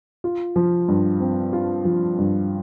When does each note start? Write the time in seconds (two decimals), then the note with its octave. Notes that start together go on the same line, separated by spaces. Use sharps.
0.24 F4
0.56 F3
0.88 G2
1.20 C4
1.53 F4
1.85 F3
2.18 G2